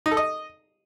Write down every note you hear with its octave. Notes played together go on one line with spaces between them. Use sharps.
D#4
A4
D#5